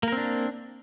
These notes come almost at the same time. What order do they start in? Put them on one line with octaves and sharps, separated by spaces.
A#3 A#4 C4 D4